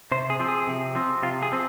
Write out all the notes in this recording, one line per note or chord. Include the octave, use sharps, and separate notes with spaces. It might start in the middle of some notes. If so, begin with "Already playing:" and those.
C3 C5
G#4
F3 C4
G#4
C3
F3 C4
C3 F4
G#4
F3 C4